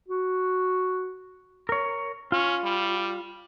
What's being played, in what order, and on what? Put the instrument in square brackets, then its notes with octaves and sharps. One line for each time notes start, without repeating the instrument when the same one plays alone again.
[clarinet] F#4
[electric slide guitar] A#4 C#5
[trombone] C#4 [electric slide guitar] F4
[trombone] G3